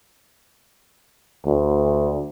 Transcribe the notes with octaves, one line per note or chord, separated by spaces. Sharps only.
D2